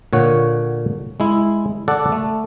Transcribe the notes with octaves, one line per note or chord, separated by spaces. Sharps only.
A#2 D3 C#5 F#5
G#3 E4
A4 D5 F#5
A3